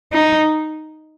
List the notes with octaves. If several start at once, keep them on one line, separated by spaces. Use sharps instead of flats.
D#4